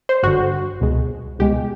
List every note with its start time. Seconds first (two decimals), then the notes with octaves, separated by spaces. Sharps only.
0.09 C5
0.23 G1 G2 D3 F#4
0.81 C#2 B2 G#3
1.39 C#2 B2 G#3 G4